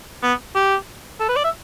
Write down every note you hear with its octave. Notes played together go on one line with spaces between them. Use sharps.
B3
G4
A4
B4
D5
E5